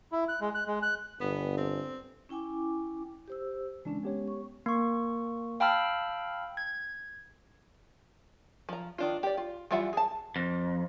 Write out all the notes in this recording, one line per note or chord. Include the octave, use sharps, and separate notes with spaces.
E4
F#6
G#3
F#6
G#3
F#6
G1 B3
C4
C#4 E4 G5 G#5 D6
G4 C5 E6
C#3 E3 G#3 C#4 D4
B3 G4 C#5
C#6
A#3 C#6
F5 G5 A5 B5 E6 F6
G#6
F3 A#5
D#3 D4 F4
G4 D5
F4
E3 G3 F4 E5 F#5
G#4 A5
F2